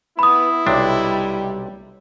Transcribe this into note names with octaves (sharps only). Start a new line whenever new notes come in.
B3 E4 B5 D#6
B1 C3 G3 D4